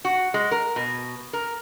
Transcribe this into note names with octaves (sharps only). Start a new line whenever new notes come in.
F#4
G#3
A#4
B2
A#4